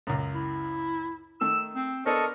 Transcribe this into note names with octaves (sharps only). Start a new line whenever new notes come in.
C#2 F#2
E4
D#3 A3 E6
C4
B3 D4 A4 A#4 C5 D#5 C#6